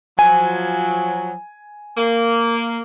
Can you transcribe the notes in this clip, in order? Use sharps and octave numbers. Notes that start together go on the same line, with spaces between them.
F3 F#3 G#5
A#3